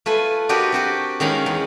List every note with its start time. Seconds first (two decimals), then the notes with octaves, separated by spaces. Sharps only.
0.06 A3 F4 B4 G#5
0.49 D4 F#4 G4 A#4 B4 D#5
0.72 C4 F#4 G4
1.20 D#3 G#3 C#4 F5 A#5 B5
1.46 E2